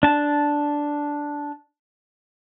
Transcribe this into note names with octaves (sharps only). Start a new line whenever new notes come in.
D4 A5